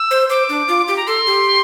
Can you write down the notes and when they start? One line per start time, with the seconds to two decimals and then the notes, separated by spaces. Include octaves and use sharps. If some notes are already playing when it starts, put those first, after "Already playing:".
Already playing: E6
0.11 C5
0.30 C5 D6
0.49 D4
0.68 F4
0.88 G4
0.97 A#5
1.07 A4 C6
1.27 G4